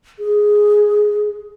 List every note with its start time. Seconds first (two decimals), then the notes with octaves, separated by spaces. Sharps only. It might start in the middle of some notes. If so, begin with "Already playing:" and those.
0.19 G#4